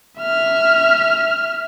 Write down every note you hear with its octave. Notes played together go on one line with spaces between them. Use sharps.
E5 F6